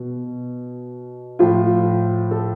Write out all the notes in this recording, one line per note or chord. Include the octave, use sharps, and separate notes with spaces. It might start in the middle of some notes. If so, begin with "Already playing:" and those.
Already playing: B2
A2 F3 F4
A4